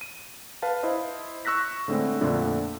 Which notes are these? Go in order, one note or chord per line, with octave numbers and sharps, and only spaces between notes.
D#7
B4 F5 A5
E4 C5 D#5
C#6 E6 F#6 A#6 B6
A2 D3 G#3 A3 C4 E4
F2 A#2 D3 A3 F4